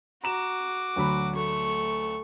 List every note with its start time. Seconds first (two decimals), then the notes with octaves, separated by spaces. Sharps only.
0.24 F#4 A#5 D6 E7
0.96 D2 F#3 B5
1.35 A3 C#6